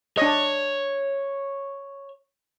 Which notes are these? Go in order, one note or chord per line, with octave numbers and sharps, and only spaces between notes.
D4 C#5 D#5